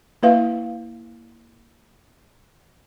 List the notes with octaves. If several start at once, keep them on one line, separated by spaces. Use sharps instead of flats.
A#3 E4 B4 E5 F5